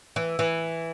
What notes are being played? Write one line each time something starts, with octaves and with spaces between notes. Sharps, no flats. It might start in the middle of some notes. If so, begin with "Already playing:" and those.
E3
E3